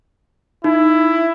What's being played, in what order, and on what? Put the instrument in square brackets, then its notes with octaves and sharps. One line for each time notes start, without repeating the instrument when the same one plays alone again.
[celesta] D#4 [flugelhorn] E4